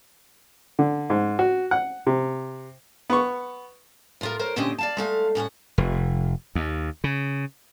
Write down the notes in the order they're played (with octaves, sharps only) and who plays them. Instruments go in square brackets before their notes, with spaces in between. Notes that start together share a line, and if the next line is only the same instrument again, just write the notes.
[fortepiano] D3
G#2
F#4
F#5
C3
B3 C#6
[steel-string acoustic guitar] A2 F4 A#4
A#4 C5 C#5
A#2 D3 C4 C#4 G4 D#5
D5 F5 A5
G#3 A3 F5
A2 C#4 F5 F#5
[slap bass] F1
D#2
C#3